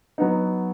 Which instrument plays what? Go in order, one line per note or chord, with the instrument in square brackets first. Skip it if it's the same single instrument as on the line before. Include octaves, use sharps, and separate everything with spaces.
[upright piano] F#3 B3 D#4